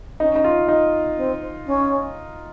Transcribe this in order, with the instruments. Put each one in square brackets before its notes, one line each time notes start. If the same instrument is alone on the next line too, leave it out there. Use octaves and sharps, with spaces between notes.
[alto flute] C#4 [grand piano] D#4
[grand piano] D#4
F4
D#4
[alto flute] C4
C#4